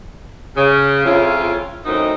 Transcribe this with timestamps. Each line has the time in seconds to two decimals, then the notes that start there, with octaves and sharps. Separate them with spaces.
0.57 C#3
1.06 F2 C#3 C#4 E4 F4
1.85 F#2 A2 C4 D#4